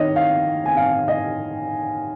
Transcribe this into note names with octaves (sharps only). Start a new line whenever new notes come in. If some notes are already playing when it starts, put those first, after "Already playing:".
Already playing: D#3 C#5 D#5
F5
G#5
F5
D#5